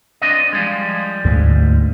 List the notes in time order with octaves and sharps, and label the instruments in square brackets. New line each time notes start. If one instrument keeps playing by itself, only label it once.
[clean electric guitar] C4 D4 D#5
F3 G3 G#3
[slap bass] D2 G#2